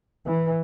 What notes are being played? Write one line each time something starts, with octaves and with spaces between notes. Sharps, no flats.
E3